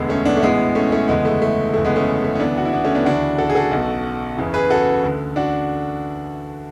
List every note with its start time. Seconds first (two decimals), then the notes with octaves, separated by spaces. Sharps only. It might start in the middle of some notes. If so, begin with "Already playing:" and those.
Already playing: E1 D2 D3 G#3 B3
0.09 A3 C#4
0.25 B3 D4
0.37 A3
0.42 A1 A2 E3 G#3 B3
0.75 A3 C#4
0.92 A3 C#4
1.08 F#1 E2 D3 G#3 B3
1.25 A3
1.42 A3
1.74 F#1 E2 D3 A3
1.85 G#3 B3
1.96 A3 C#4
2.24 A3
2.35 C#4
2.40 D2 C#3 E3 B3 D4
2.58 F#4
2.65 E4
2.73 B3 D4
2.85 A3 C#4
2.95 B3 D4
3.05 D2 C#3 E3 D4 F#4
3.38 F#4 A4
3.50 G#4
3.55 F#4 A4
3.71 B1 B2
4.37 F#1 E2 C#3 E3
4.54 G#4 B4
4.70 F#4 A4
5.04 D2 D3
5.36 D4 F#4